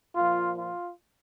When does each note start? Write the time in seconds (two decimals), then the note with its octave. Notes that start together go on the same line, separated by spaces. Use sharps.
0.16 A#2 F3 F4
0.56 F4